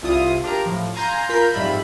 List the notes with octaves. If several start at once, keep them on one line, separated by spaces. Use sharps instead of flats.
C2 E4 F4 D#6
D4 F4 G4 A#4 A#5
A2 F3
F5 G#5 A#5 C6 G6
F4 A#4 B5 G6
F2 G#2 G3 F4 E5 B5